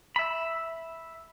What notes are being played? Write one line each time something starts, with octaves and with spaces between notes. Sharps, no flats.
E5 B5